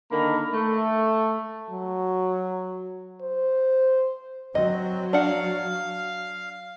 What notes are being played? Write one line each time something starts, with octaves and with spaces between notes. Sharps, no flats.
D3 D#3 A#3 A#4 A#5 B5
A3
F#3
C5
F#3 C4 D#5
D4 F5 F#5